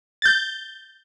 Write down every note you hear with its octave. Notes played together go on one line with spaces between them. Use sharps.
G6 A6